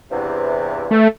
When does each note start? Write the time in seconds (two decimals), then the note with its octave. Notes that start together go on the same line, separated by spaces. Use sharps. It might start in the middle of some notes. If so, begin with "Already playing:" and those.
0.11 E2 G2 C3
0.91 A3